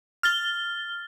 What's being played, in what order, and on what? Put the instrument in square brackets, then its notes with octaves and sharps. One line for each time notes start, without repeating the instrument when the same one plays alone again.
[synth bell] F6 A6 G7